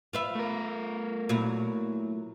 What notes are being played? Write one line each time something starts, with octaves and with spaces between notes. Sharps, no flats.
F4 B4 E5
A3 A#4
A#2 F#3 E4